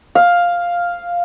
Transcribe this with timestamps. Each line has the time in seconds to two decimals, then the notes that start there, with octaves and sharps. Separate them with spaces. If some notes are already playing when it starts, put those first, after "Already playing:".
0.15 F5